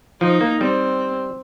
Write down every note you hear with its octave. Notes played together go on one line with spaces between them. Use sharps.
F3 D#4
A#3
G3 C4